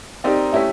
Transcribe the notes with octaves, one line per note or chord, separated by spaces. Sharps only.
C4 D#4 G4 A#4 D5
A3 C#4 E4 G4